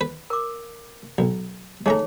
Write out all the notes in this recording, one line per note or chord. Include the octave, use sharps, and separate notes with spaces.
B4
A#4 D6
B1
G#3 A3 D#4 G#4 C#5 A#5